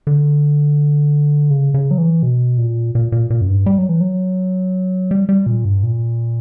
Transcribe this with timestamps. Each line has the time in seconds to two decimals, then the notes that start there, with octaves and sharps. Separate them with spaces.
0.07 D3
1.50 C#3
1.74 C#3
1.91 F#3
1.98 E3
2.23 B2
2.58 A#2
2.95 A#2
3.12 A#2
3.30 A#2
3.41 F#2
3.49 G2
3.66 G3
3.78 F#3
3.89 E3
4.01 F#3
5.11 G3
5.29 G3
5.46 A#2
5.65 G2
5.83 A#2